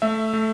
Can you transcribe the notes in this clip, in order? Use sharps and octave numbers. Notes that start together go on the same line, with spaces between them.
A3 E5
A3